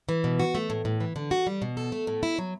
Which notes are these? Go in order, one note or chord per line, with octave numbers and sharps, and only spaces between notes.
E3
B2
F#4
A3
A2
A2
E3
D3
F#4
G3
B2
A4
A3
A2
E4
F#3